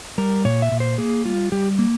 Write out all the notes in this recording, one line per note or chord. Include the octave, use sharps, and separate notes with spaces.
G3 A#4
A#2 C#5
E5
A#2
C5
A#3 G#4
G3 F4
G3 G4
A#3